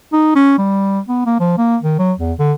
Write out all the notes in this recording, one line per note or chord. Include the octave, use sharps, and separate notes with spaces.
D#4
C#4
G3
B3
A#3
F3
A#3
D#3
F#3
E2
D3